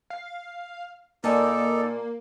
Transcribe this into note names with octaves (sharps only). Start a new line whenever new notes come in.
F5
A#2 A#3 D#4 A4 D5 G#5 A5